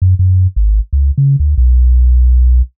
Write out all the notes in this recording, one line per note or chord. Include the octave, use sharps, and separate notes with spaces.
F#2
F#2
G#1
C#2
C#3
D2
B1